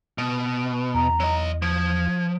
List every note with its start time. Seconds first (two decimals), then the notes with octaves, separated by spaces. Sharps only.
0.18 B2
0.94 E2 A#5
1.20 F#3 D#5
1.62 F3 G#6